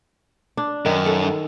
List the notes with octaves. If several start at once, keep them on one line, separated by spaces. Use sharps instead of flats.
D4
F#2 D#3
A4